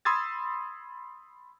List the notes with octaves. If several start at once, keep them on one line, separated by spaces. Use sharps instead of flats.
B5 C6 D#6 E6 G#6 A6